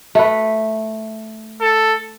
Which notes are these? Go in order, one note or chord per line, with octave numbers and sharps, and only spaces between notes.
A3 B4
A4